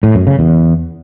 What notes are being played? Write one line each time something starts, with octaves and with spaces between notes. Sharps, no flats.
A2
F#2
C#3
E2